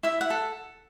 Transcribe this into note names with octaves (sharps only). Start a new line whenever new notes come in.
E4 E5
F#5
A4